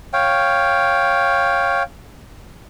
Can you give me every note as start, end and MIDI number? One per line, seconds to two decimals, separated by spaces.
0.13 1.83 73
0.13 1.83 77
0.13 1.83 79